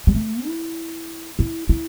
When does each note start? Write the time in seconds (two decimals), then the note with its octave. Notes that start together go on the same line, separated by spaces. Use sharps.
0.07 G3
0.15 A3
0.46 E4
1.39 E4
1.69 E4